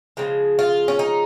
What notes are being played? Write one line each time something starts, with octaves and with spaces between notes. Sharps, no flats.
C#3 F3 G#3
F4
C#4
D#4